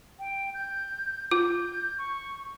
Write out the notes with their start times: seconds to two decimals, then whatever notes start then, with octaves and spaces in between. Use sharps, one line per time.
0.19 G5
0.54 G6
1.31 F4 G6
1.98 C#6